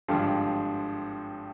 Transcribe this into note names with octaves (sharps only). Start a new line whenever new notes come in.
G#1 G2 D3 F3